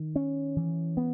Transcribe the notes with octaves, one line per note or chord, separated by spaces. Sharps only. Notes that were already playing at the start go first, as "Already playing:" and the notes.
Already playing: D#3
C#4
E3
B3